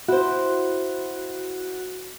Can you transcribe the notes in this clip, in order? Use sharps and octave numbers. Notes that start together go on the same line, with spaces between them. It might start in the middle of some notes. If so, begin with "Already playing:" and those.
E4 F#4 C5